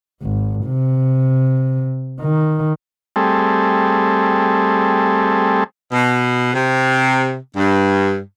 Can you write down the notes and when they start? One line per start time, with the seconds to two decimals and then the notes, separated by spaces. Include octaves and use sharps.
0.23 G#1
0.66 C3
2.20 D#3
3.16 G3 A3 C4 G#4 A4
5.92 B2
6.53 C3
7.56 G2